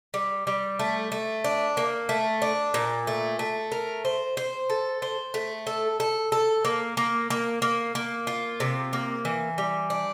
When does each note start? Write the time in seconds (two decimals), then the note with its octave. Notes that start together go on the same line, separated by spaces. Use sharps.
0.14 G3
0.47 G3
0.79 A3
1.12 A3
1.44 D4
1.77 A#3
2.09 A3
2.42 D4
2.74 A#2
3.07 A3
3.39 A3
3.72 A#4
4.05 C5
4.37 C5
4.70 A4
5.02 C5
5.34 A3
5.67 A4
6.00 A4
6.32 A4
6.65 A#3
6.97 A#3
7.30 A#3
7.62 A#3
7.95 A#3
8.27 F4
8.60 C3
8.93 A#3
9.25 E3
9.58 G3
9.90 D4